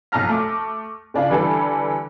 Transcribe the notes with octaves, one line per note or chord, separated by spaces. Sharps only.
B1 F3 A5 A#5 F6 A#6
A3 D6
C#3 D4 F4
D3 E3 G3 A4 B4